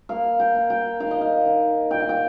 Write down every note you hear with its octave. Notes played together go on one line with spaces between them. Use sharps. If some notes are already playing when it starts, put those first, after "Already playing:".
A#3 F5
G5
A#3
G5
D#3 F5
D#5
F5
D#3
A#2 G5
F5
G5